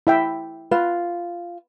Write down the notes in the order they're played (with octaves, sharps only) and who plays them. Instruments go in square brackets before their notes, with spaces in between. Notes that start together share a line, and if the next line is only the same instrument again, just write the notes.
[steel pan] E4 E5 G5
[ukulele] F4 [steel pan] B4